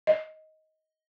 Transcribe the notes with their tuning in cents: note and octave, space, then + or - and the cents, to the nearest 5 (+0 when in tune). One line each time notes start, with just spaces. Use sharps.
D#5 +15